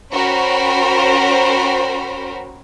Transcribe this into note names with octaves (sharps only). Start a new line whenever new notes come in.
C#4 F#4 A#4 C5 G5 B5